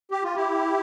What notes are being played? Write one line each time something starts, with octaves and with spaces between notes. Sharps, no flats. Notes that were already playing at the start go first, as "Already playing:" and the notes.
G4
F4
E4 G4